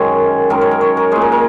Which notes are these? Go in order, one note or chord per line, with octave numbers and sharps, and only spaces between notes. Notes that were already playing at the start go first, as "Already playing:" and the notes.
Already playing: F#2 D#3 G#3 C#4 A#4 C#5
F#2 D#3 G#3 A#4
C#5
A#4
C#5
A#4
A#2 G#3 G#4
A#4
A#4